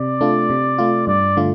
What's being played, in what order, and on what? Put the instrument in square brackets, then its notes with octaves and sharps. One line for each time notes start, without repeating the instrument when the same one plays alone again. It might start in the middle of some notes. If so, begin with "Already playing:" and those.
Already playing: [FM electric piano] C3 [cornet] D5
[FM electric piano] A3 D4 F4
C3
A3 F4
[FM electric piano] G2 [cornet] D5
[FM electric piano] D3 A3 F4